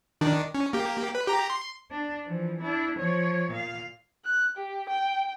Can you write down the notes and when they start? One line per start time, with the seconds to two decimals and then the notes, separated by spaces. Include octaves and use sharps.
0.21 D#3 D4
0.55 C#4
0.73 A#3 G4
1.15 B4
1.27 G4 A#5
1.50 C6
1.91 D4
2.26 E3 F3
2.61 D4 E4
2.99 F3 C#5
3.51 A#2 F5
4.25 F#6
4.57 G4
4.89 G5